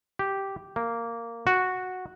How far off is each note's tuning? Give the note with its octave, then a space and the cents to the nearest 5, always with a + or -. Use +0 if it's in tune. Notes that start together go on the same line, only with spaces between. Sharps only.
G4 -5
A#3 -10
F#4 -5